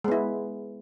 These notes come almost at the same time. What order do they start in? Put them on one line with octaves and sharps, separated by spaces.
G#3 B3 E4